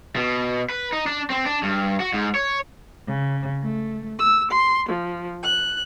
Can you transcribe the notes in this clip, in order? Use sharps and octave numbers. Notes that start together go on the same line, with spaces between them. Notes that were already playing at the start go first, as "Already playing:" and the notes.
B2
B4
D#4
D4
C4
D4
G2
F#4
G#2
C#5
C#3
A3
E6
C6
F3
F#6